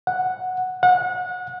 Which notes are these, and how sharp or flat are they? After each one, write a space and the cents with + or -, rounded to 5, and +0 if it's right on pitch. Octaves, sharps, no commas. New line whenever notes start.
F#5 -5
F#5 -30